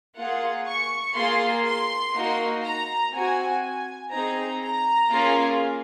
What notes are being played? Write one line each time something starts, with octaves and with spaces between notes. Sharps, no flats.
A#3 F4 G#4 F#5
C#6
A#3 F4 G#4 C6
C6
A#3 D#4 F#4
A#5
C4 F#4 G#5
G#5
C4 D#4 G#4 A#5
A#5
A#3 C#4 F4 G#4